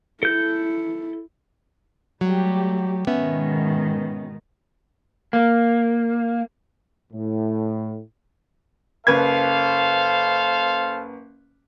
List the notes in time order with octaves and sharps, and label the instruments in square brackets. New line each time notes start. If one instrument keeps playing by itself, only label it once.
[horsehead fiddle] E4 [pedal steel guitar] A4 G6
[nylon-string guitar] F#3 [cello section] G3 A3 G4
[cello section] G#2 B2 D#3 [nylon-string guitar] B3 C#4 E5
[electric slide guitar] A#3
[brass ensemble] A2
[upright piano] F#1 B4 G#6 [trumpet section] A4 C5 F5